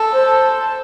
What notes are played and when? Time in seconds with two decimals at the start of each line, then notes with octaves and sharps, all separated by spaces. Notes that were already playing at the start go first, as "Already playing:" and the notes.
Already playing: A4
0.14 C5